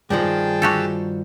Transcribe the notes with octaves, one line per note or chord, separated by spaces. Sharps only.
G2 D#3 F3 G#4 G5 A5
F#4 G4 A4